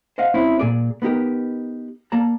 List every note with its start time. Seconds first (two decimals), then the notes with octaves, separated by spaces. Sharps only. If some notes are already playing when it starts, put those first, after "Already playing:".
0.18 C5 D#5 F5 F#5
0.34 C4 C#4 E4
0.59 A#2 G#4 D5
1.02 B3 D#4 G4 A#4
2.12 A#3 D5 A5 A#5